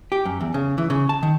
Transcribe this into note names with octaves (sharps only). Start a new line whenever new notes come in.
G4
F#2
E2
C#3
E3
C#3
A5
D#3